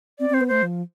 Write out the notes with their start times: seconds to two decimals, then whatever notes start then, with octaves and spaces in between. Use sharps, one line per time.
0.19 C4 D5
0.30 C4 C5
0.41 B3
0.48 A3 C5
0.63 F3